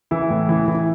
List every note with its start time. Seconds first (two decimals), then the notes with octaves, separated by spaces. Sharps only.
0.11 E3 E4
0.30 A2
0.49 E3
0.68 E3
0.74 E4